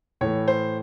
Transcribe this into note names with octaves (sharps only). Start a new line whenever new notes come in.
A2 E3 A3 C#5
C5